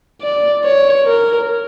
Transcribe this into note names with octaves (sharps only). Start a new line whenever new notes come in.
D5
C#5
A#4